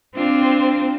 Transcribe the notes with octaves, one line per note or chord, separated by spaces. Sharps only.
C4 D4 F4